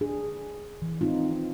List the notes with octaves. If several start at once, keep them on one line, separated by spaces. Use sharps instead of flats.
D4 G#4
E3
C4 D#4 F4